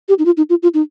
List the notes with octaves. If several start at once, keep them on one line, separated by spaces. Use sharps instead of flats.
G4
D#4
F4
D#4
F4
F4
D#4